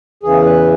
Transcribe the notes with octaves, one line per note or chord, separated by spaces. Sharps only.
E2 C#3 E3 G#4
B4